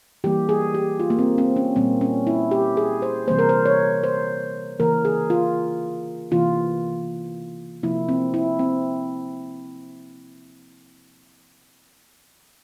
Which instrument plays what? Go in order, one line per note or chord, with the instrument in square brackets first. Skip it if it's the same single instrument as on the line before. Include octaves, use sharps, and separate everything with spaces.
[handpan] E3 G3 A#3 G4
G#4
G4
F4
A#3
C4
C4
C#4
A#2 G3 A#3 C4
C#4
E4
G4
G#4
C5
C3 E3 G3 A#3 C5
A#4
C5
C#5
C5
C#3 E3 A#3 A#4
G#4
F4
C3 E3 A#3 F4
C3 F3 A#3 E4
C4
E4
C4